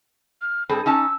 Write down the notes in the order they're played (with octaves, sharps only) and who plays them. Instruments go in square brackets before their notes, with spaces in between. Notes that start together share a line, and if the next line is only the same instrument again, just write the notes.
[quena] F6
[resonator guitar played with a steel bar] G2 C4 A4 [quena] G#4
[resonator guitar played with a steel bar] C#4 D#4 A5 [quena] E6